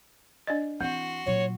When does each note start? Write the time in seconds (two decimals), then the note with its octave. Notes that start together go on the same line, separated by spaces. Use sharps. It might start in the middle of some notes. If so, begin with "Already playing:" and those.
0.47 D4 D5 D#5
0.81 E3 C4 F#4 C6
1.26 A#2 F#3 C#5